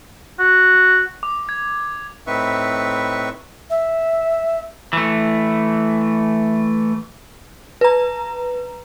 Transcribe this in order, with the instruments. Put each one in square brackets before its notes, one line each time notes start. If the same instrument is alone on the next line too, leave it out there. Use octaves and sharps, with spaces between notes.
[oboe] F#4
[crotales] D6
G#6
[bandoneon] A2 C4 D#4 B4 E5 C#6
[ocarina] E5
[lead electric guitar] E3 A3
[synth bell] B4 A#5